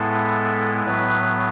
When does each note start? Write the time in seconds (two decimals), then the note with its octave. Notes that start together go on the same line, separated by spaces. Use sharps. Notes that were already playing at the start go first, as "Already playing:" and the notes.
Already playing: A2 G#3 B3 E4 A4
0.86 A2 F#3 B3 B4